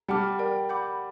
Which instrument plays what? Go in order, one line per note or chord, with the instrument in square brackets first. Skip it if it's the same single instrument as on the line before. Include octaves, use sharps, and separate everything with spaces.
[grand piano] G3 [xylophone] D5 F#5 A5 D6 F6
[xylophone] A#4 D5 G5
F#5 B5 D6 G6